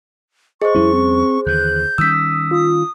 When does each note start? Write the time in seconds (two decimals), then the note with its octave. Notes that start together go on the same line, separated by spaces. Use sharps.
0.62 G#4 C5 D#5 C#6
0.75 F2 G3 C#4 E4
0.93 C4
1.46 D#2 D3 E3 F#6 G6
1.98 D#3 G3 C#4 D#6 E6 B6
2.51 F4 D#6